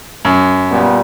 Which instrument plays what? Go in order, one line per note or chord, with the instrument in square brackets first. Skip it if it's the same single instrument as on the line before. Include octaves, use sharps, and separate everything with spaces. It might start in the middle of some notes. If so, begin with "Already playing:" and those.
[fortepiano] F#2
[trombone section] A#2 G3 B3